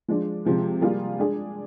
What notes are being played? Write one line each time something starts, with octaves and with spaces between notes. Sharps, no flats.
F3 G#3 D4
C3 F3 G#3
G3 A#3 F4 G#4
G#3 D4 G#4